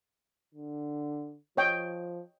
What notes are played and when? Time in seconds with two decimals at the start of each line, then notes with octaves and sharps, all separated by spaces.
0.54 D3
1.57 F3 C#5 D#5 G5